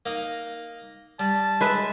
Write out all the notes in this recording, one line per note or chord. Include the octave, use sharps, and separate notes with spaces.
A#3 D#4
G3 A5
G#3 B4 E5